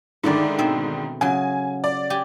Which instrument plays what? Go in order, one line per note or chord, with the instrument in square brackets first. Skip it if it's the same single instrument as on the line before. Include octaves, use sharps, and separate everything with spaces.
[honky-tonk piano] G#2 D3 D#3 [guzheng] A3 E4 D5
[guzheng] B2 C4 E5
[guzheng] C#3 F#3 [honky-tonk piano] G#5
[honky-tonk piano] D5
[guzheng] G4 G#5